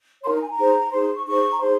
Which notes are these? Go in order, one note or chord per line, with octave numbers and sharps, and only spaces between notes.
D#4 A#4 C#5 C6
A#5
G#5
A#5
D#4 G#4 C5
D#4 G#4 C5 C6
C6
C#6
D#4 G#4 C5 C#6
A#5
D#4 G#4 C5 C6